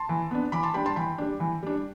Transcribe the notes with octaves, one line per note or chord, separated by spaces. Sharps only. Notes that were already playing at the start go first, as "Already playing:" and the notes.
Already playing: A5 C6
E3
B3 D4
E3 B5 D6
A5 C6
G3 D4 G5 B5
A5 C6
E3 G5 B5
G3 D4
E3
G3 D4